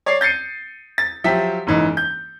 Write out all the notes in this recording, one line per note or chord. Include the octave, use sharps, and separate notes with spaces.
C#5 D5 D6 C7
G6 A6 C7 C#7 D#7
A6
F3 F#3 G4 E5 B6
F#1 G#2 E3 D#4
G6